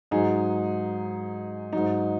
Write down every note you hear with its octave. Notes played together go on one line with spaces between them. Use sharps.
G#2 F#3 D#4 G#4
G#2 F#3 D#4